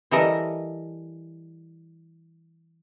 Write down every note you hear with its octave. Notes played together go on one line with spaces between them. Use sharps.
E3 G3 A4 A#4 D#5